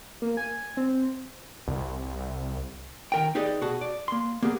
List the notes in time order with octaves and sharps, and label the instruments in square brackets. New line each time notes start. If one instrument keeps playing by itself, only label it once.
[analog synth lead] A#3
G#5
C4
[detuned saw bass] C2
[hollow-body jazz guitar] D#3 A#4 G5
D#4 G4 G#4 B4 D5 D#5
B2 F#4 G#4 A5
D5
A#3 C6
A#3 B3 G4 G#4